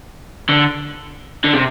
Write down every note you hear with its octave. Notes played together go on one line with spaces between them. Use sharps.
D3
D3
C3